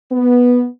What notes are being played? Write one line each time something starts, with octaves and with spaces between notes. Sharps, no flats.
B3